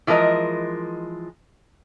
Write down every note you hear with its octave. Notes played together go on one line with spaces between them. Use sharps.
E3 F3 G#3 A#4 D#5